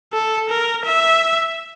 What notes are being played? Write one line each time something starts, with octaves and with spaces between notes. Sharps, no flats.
A4
A#4
E5